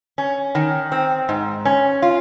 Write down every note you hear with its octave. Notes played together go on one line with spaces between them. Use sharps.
C#4
D#3
C4
G#2
C#4
F4